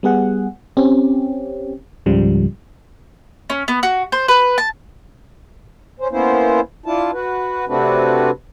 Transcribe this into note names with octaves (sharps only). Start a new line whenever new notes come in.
G3 B3 G#4 F#5
C4 C#4 G4
C#2 G#2 C#3 F3 G3
C#4
B3
F#4
C5
B4
A5
C#4 C5
A#3 B3 C#4 E4 C5
D4 E4 F4 A5
F#4 B4
C3 A3 C4 D4 F#4 B4